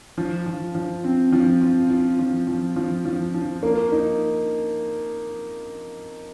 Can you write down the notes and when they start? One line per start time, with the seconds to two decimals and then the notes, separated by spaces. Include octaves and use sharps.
0.18 F3
0.46 F3
0.75 F3
1.04 C4
1.32 F3
1.61 F4
1.90 F4
2.19 F3
2.47 F3
2.76 F3
3.05 F3
3.34 F3
3.63 A#3
3.92 D#4